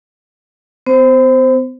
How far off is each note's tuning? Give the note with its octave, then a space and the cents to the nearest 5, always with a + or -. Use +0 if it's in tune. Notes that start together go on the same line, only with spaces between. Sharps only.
B3 +45 C5 +0